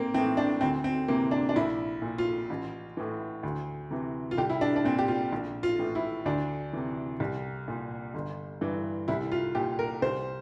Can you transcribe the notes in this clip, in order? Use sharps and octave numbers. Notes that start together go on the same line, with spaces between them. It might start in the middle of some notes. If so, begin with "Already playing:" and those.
Already playing: A#1 A#3 C4
A2 E3 C4
D4
D2 C4
C4
C3 E3 A#3
D4
D4
A#1 E4
A#2
F4
A1
A2 E3
D2
C3 E3
F4
C2 G4
E4
D4
D4
A#2 C4
G4
F4
A#1
F4
A2 E3
E4
D2 D4
C3 E3
C2
A#2
G1
G2 E3
C2 E4
F4
A#2 G4
A#4
C2 C5